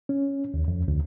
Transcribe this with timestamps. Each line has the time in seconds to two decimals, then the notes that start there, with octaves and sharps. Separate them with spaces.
0.09 C#4
0.54 D#2
0.68 F2
0.88 D2